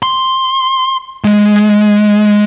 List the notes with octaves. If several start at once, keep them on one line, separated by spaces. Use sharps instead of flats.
C6
G#3